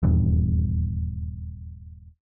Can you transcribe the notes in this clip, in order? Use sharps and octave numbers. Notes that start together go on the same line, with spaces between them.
D#1 E2 G2